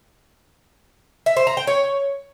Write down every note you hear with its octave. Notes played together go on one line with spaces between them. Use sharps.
E5
C5
A#5
G5
C#5